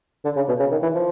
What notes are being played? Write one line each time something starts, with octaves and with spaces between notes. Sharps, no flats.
D3
C#3
B2
C#3
D#3
E3
F3